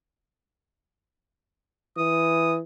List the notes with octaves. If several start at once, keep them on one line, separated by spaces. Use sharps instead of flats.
E3 D#6